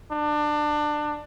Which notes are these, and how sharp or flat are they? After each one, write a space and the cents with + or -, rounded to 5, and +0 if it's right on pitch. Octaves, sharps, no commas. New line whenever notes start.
D4 +25